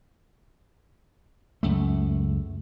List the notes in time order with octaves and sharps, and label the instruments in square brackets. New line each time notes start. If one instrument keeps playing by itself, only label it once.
[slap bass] C#2 F#2 A3